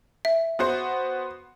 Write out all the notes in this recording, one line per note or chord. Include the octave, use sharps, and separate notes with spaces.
E5
B3 F#4 C5